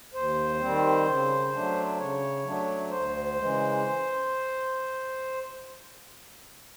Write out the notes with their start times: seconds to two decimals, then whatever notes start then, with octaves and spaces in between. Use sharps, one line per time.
0.14 D#2 C5
0.59 D#3 G3 C4
1.06 C#3
1.52 F#3 A3 D4
1.97 C#3 C#5
2.44 F#3 A3 D4
2.90 D2 C5
3.37 C#3 E3 G#3